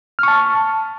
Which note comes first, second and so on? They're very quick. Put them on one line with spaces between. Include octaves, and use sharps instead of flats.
F6 C#6 A5